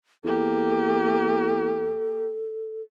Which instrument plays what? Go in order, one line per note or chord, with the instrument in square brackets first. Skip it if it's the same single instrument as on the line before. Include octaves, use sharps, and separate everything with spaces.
[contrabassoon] E2 [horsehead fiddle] A#3 G4 [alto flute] A4